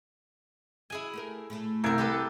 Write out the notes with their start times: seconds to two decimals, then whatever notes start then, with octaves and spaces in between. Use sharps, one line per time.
0.90 E4 F#4 G#4 G#5
1.13 A3 G4 A#4
1.50 A2 A3
1.84 C2 A#4 G5 E6 G#6
1.98 G4 A4 B4